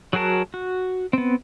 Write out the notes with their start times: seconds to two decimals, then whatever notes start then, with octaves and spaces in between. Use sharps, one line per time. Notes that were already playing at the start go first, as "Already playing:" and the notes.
0.13 F#3 F#4 G#4 A#4 A5
0.54 F#4
1.13 B3 C4